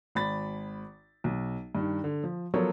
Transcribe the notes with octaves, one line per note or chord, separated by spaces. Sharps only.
G#1 B5 A6
B1
G2 D#3
D3
F3
F3 F#3 B3 A4 A#4 C#5